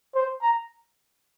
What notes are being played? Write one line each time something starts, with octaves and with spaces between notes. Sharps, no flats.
C5
A#5